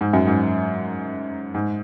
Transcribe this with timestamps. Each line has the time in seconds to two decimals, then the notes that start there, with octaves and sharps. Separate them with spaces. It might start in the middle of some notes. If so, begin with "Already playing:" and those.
0.01 G#2
0.13 F#2
0.27 G#2
1.54 G#2